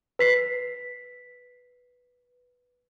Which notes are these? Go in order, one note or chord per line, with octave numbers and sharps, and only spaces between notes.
B4 B6 C7